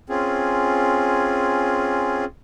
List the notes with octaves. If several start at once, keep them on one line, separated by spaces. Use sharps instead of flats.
C4 C#4 F4 G#4